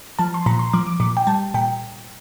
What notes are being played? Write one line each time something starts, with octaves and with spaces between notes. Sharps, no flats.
F3 A5
C6
A#2 A#5
C6
F3 D6
D6
A#2 D6
G5
G3 A5
A#2 G5